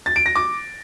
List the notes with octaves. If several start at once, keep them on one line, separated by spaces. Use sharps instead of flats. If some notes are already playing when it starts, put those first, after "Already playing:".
A6
D7
A#6
D6